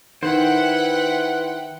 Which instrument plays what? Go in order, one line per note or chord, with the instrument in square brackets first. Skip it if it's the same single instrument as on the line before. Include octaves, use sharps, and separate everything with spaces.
[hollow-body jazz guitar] D#3 [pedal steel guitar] E4 C5 [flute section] B4 F#6 [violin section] F#5 G5